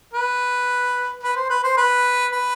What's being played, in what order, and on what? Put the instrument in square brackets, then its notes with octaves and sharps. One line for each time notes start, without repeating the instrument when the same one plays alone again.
[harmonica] B4
B4
C5
B4
C5
B4
B4